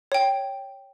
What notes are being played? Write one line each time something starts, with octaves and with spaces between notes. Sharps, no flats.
C#5 G5